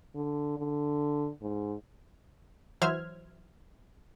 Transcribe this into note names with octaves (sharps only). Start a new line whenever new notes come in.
D3
D3
G#2
E3 F#3 C5 E5 F6 G#6